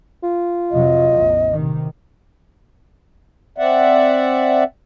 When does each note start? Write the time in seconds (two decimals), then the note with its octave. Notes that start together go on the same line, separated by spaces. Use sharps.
0.23 F4
0.71 F2 C3 F#3 D#5
1.13 A1 E2
1.53 C3 D#3
3.58 C4 D5 E5 F#5